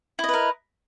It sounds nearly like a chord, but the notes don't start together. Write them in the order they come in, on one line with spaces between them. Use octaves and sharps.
E4 D#5 B4 A#4